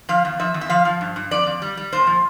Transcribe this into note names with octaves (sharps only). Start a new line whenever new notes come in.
F3 F5
E2
F3 E5
E2
E5
F3 F5
F3
G2
G2
F2 D5
F2
G3
G3
A#2 C5
F3